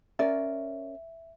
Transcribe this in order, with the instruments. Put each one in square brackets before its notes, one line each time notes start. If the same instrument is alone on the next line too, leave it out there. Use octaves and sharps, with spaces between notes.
[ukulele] C#4 A#4 D5 [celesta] E5